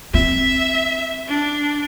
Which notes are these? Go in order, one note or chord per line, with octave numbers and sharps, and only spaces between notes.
C4 E5
D4